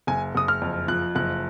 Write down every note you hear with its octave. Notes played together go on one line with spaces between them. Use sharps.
F#1 G#5
F#1 D#6
F6
F2
F3 F#6
F#1 F#6